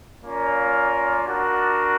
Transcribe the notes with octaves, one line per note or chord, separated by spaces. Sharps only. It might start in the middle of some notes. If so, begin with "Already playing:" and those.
A#3 C#4 F4 A#4 D5
D4 F#4 A#4